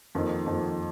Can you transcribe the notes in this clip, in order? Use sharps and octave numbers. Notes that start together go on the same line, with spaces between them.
F2 D#3 A#3
F2 D#3 A#3